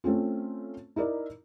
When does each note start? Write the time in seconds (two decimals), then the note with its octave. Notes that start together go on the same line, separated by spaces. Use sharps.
0.04 A3 C4 C#4 F4
0.96 D#4 E4 A#4 D5